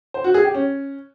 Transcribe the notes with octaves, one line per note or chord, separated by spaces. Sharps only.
C5
F#4
G#4
G4
C#4